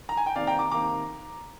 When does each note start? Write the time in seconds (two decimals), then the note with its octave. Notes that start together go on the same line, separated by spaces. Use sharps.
0.09 A#5
0.17 G#5
0.26 G5
0.35 C3 D#3 A#3 D5 F5
0.47 G5 A#5
0.59 A#5 D6
0.71 C3 D#3 A#3 A#5 D6